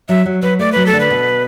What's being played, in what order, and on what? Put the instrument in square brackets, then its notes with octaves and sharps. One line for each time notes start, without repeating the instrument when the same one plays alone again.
[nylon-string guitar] F#3 [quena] E5
[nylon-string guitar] F#3
[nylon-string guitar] F#3 [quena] B4
[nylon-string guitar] A3 [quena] D5
[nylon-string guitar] F#3 [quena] B4
[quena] A4
[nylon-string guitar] D3
[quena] B4
[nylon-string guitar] B2